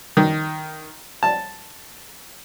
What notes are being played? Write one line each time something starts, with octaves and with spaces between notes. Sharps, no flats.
D#3
A5